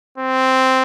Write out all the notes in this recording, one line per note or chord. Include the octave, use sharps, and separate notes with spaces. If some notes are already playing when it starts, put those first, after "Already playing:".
C4